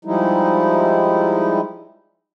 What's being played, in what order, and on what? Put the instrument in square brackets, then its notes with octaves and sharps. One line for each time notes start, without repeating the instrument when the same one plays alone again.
[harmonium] F3 G3 G#3 D#4 E4